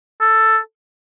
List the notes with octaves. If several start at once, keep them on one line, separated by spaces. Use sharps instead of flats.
A4